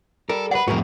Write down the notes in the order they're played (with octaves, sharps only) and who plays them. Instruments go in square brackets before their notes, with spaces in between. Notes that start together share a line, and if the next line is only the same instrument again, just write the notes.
[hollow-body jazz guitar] G3 A#4 [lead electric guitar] A4
[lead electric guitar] B4 D5 [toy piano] F#5
[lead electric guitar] F2 A2 [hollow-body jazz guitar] F#4 G#4 A#4